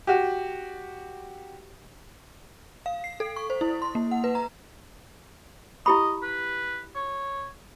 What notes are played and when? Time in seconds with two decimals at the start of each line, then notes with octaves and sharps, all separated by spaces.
0.07 F#4 G4
2.86 F5
3.04 C7
3.20 A4
3.36 C#6
3.50 C5
3.61 E4
3.82 C6
3.95 A#3
4.11 F#5
4.24 B4
4.35 A#5
5.86 E4 G4 D#5 B5
6.22 B4
6.95 C#5